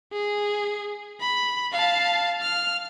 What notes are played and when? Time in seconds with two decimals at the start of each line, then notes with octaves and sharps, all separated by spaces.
0.13 G#4
1.21 B5
1.72 F5 A5
2.42 F6